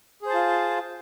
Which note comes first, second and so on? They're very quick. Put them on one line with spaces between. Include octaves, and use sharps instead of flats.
G#4 C5 A5 F4